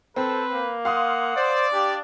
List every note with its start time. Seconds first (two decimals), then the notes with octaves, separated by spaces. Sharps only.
0.16 C4 A4 B4
0.54 A#3
0.85 F5 F#5 C6 D#6
1.36 C5 D5
1.73 D4 G4